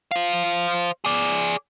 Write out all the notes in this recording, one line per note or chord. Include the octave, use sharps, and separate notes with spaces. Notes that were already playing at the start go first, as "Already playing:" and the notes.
C5 F5
G#4 D5